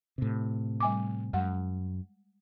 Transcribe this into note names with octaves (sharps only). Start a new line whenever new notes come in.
A2 C3
G3 G#5 D6
F#2 G#3 F#5